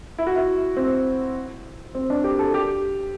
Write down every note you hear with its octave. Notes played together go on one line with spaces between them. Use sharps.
E4
F#4
E4
C4
C4
D4
G4
A4
G4